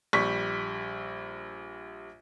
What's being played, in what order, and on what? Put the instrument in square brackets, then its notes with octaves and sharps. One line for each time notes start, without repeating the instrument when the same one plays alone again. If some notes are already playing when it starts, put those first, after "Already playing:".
[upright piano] A#1 G3 C#6 B6